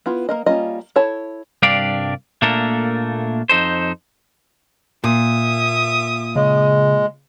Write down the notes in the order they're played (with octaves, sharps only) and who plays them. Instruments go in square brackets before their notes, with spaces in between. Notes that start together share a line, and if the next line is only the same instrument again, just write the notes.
[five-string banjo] B3 E4 F4
A#3 A#4 D#5
G3 A#3 C#4 F4 D#5
E4 A4 C#5 A5
[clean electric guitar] C2 G2 D4 G4 D5 F5
A#2 A3 A#3 D4 A4 A#4
F2 D#4 A4 C5
[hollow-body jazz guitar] A#2 [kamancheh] E5 D#6
[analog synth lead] C#3 [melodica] G#3